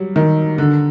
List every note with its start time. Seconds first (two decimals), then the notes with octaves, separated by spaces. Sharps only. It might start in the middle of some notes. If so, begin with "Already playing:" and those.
Already playing: F#3 G3
0.16 D#3
0.58 D3